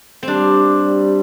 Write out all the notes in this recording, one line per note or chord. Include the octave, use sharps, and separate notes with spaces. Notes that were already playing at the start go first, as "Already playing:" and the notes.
C4
G3 D4